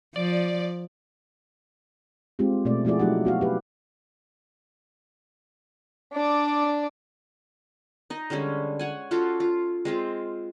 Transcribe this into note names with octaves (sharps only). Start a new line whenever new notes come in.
F3 D5
G#3 C4 F4 G4
B2 A3 D5
F3 A3 E4 F#4 G#4 D5
F#3 A3 D#4 G4 F#5
B3 F#4 F5
G4 B4
D4 D5
D#4 D#5
D3 G3 G#3 C#4
C#5 F#5 G#5
C#4 F4 F#4 A4
F4
G#3 C4 F4